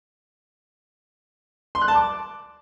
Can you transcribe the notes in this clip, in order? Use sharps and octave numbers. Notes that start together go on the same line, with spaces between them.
C6
F#6
A5
D6